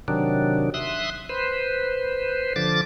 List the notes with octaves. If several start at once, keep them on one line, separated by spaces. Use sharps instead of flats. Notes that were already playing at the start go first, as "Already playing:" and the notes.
C3 D#3 F#3 D4
E5 C6 D#6 F#6
B4 C5
D3 F3 D6 A6